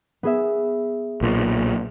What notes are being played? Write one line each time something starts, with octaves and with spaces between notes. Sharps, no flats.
B3 G#4 E5
B1 A#2